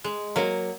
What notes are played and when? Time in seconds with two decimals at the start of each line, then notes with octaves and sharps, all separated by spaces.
0.04 G#3
0.36 F#3 A#3